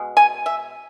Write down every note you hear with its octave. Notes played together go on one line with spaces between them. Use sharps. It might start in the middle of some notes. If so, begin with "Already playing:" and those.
Already playing: B2 G#3
G#5
E5